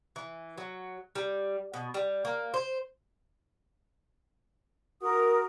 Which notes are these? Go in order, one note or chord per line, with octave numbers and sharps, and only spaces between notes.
E3
F#3
G3
B2
G3
A#3
C5
F#4 A#4 D#6